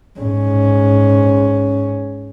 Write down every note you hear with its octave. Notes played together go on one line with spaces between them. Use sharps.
G#2 C#4